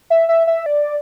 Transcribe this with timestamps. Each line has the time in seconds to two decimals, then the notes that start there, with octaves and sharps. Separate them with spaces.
0.10 E5
0.29 E5
0.47 E5
0.66 D5